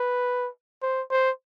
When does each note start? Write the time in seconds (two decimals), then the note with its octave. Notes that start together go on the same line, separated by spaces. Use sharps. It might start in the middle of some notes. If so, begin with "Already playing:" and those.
Already playing: B4
0.82 C5
1.11 C5